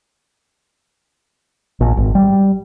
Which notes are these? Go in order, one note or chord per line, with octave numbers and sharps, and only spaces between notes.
A#1
G#1
G3